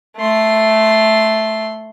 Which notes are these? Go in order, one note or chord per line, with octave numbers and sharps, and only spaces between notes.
A3 C6